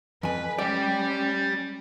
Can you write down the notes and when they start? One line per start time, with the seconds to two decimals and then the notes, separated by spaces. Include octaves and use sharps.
0.23 F2 B4 G#5
0.59 G3 G#3 C#4 G4 D5